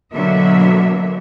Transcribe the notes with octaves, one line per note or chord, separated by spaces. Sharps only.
B2 D3 F#3 A#3 E5